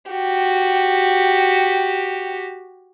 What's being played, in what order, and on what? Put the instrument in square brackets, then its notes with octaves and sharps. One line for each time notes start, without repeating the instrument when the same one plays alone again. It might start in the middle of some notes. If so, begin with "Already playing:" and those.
[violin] F#4 G4